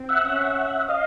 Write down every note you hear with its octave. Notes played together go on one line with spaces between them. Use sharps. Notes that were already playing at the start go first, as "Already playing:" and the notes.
Already playing: C4
E5 F#5
C#4 E5 F#5
D#5 F5